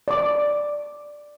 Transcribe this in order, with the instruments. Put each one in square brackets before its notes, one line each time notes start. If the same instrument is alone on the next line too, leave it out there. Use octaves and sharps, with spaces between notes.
[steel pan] D5 D6